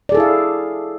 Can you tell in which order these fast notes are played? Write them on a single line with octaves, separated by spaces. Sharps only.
D5 G#4 A4 E4 F5